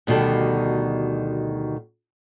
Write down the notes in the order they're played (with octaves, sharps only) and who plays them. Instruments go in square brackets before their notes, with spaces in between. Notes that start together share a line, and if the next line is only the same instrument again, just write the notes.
[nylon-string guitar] D2 B2 D#3 G3 A4